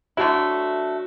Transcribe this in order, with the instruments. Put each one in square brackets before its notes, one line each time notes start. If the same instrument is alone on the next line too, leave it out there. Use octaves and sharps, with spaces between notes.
[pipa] D3 F#3 A3 E4 [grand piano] F#4